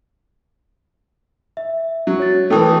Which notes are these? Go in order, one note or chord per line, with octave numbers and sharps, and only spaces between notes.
E5
F#3
C#5 A6
E3 A3 A4 G5 D#6